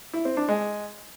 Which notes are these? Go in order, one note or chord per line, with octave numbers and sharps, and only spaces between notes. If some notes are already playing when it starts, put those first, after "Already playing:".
E4
C4
D4
G#3